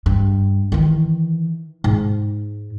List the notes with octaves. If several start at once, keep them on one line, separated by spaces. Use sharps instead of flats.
G2
D#3 E3
G#2